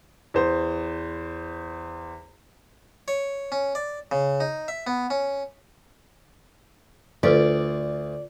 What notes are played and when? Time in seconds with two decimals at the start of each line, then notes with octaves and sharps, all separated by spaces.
0.34 E2 C5
3.08 C#5
3.52 C#4
3.75 D5
4.11 C#3
4.40 D#4
4.68 E5
4.87 B3
5.10 C#4
7.23 D2 F4 A4 B4 D5